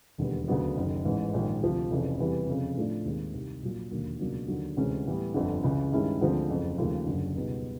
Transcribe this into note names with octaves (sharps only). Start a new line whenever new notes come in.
E1 D#2 D3 G3 B3
D2 C#3 F#3 B3 D4
F#1 F#2 D#3
A1 G#2 E3
A#1 G#2 D#3
D2 C3 F3
F1 F2 C#3 E3
E2 C3 E3 G3 B3
F1 F2 C#3
A2 F3 A3 D4
D#2 D#3 G#3 C4
C2 C3 D#3
A#1 A#2 F#3
E1 D#2 D3 F#3 A#3
C#2 B2 F#3 A#3 D4
D#2 D3 F#3
D2 C3 E3 G#3 C#4
A2 E3 G3 B3
G1 F2 D3
C#2 C#3 E3
G2 D#3 G#3 C#4 E4
D2 D3 F3 G#3 C4
F#1 F2 C#3
D#2 C#3 F3 A3
F#1 F#2 D3
C#2 B2 G3 B3 D#4